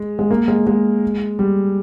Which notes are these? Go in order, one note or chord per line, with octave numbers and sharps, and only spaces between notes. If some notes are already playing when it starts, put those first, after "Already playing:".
Already playing: G#3
G#3
A#3
G#3
G#3
G3